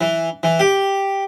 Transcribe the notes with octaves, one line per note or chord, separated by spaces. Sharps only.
E3
E3
G4